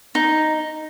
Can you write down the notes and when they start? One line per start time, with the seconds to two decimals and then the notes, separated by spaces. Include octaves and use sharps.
0.15 D#4